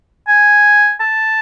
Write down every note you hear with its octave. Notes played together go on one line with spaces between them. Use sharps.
G#5
A5